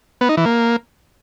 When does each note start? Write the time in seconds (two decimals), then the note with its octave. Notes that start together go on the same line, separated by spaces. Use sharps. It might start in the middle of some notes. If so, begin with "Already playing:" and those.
0.21 B3
0.29 D#4
0.37 E3
0.45 A#3